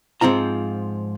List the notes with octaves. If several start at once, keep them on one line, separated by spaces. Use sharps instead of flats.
G#2 F3 C4 F4 A#5